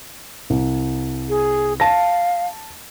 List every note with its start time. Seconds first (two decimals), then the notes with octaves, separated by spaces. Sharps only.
0.50 C2
1.29 G#4
1.80 F5 A5 A#6